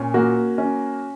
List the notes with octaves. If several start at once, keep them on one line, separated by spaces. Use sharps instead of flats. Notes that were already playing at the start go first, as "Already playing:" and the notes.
Already playing: A#2 C#4
A#3 F#4
C#4